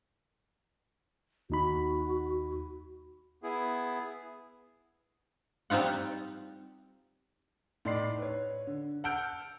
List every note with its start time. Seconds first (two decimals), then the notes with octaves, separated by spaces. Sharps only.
1.50 D#2 D#4 F#4 B5
3.43 B3 E4 G#4
5.70 G3 C4 D#4 F4 F#5
7.85 A2 D#4 D5 C6 C7
8.18 B4 C#5
8.67 D3
9.04 F#5 A5 E6 F6 G6 D7